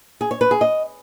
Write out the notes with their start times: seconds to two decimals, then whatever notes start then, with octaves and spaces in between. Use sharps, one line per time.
0.21 G#4
0.31 C#5
0.41 B4
0.51 G#4
0.61 D#5